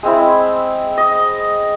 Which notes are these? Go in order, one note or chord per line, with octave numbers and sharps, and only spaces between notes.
G#3 C4 E4
D#5